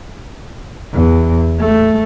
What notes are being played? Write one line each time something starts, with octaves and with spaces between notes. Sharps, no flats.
E2
A3